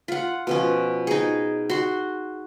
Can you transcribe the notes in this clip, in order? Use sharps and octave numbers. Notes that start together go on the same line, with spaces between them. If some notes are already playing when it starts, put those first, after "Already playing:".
F4 F#5
B2 F3 C#4
D#4 G#4
F#4 C6